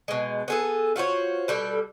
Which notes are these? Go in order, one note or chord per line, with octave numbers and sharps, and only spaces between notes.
B2 G#3
B3 G#4 A4
F4 F#4 C5 C#5
B2 G3 A4